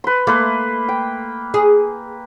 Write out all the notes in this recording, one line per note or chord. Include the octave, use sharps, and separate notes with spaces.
B4 C6
A3 A#3 B4 C6
G5
G#4